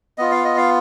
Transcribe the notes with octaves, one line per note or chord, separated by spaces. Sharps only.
B3 F4 D#5
F5
D#5
F5